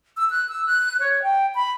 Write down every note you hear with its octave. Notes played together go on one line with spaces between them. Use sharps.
E6
F#6
E6
F#6
C#5
G5
B5